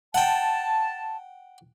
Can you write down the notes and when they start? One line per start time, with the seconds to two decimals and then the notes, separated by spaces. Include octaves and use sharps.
0.14 F#5 G5 A5